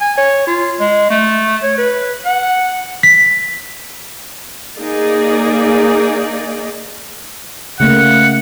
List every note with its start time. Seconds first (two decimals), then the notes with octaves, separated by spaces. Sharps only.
0.01 G#5
0.17 C#5
0.47 F4
0.80 G#3
1.10 A3
1.63 C#5
1.78 B4
2.25 F#5
3.03 B6
4.78 A#3 D#4 G#4 D5
7.80 C#3 A3 A#3 F#5